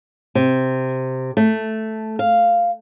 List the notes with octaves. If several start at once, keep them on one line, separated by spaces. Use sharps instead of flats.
C3
A3
F5